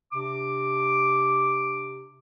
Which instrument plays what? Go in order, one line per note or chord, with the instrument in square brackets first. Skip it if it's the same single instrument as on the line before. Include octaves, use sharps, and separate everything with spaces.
[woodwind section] C3 D4 D6